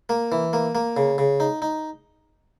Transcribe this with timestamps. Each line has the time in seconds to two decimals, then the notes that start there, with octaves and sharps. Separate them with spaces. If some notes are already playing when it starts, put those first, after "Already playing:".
0.09 A#3
0.32 E3
0.53 A#3
0.75 A#3
0.97 C#3
1.18 C#3
1.40 D#4
1.62 D#4